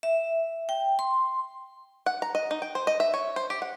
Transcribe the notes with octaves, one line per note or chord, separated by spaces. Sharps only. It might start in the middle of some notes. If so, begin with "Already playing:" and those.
E5
G5
C6
F#5
A#5
D#5
D#4
G5
C5
D#5
E5
C#5
C5
G4
F#5